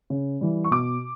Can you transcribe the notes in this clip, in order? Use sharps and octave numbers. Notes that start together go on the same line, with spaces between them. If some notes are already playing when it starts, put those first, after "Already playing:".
C#3
E3 G3
C#6
B2 D6